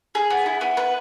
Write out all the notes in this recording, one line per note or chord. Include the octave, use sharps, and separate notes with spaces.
G#4
B3
E4
B3
B4